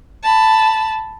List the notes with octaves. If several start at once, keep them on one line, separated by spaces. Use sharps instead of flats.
A5 B5